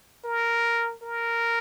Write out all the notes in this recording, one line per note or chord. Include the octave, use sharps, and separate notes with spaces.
A#4
A#4